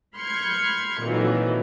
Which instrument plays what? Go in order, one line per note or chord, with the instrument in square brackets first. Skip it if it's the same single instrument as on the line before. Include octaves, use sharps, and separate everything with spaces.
[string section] B5 C6 F6 G6 G#6 C#7
F2 A#2 D#3 E3 F#3